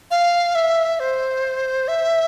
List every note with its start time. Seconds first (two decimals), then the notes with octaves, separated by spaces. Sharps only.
0.11 F5
0.55 E5
1.00 C5
1.88 E5